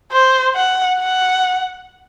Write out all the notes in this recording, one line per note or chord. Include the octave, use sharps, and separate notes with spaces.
C5
F#5
F#5